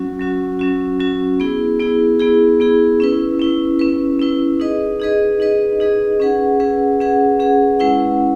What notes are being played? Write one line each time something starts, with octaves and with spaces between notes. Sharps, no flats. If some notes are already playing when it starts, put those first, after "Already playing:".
Already playing: F#3 C#4 F#4
F#3 C#4 F#4
F#3 C#4 F#4
F#3 C#4 F#4
B3 E4 G#4
B3 E4 G#4
B3 E4 G#4
B3 E4 G#4
C#4 E4 B4
C#4 E4 B4
C#4 E4 B4
C#4 E4 B4
D#4 G#4 B4 D#5
D#4 G#4 B4 D#5
D#4 G#4 B4 D#5
D#4 G#4 B4 D#5
C#4 G#4 B4 F#5
C#4 G#4 B4 F#5
C#4 G#4 B4 F#5
C#4 G#4 B4 F#5
G#3 C#4 E4 B4 F#5